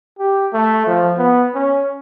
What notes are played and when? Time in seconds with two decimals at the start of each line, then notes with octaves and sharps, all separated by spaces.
0.19 G4
0.53 A3
0.87 F3
1.17 B3
1.54 C#4